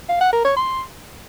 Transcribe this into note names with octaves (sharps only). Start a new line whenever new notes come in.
F5
F#5
A#4
C#5
C6